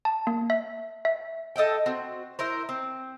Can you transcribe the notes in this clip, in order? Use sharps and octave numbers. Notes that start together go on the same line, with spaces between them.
A5
A#3
E5
E5
A4 D#5 E5 G5
C4 F#4
E4 A#4 C5
C4